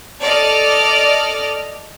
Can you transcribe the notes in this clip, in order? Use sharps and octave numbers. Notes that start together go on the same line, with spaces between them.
A4 D5 D#5 F6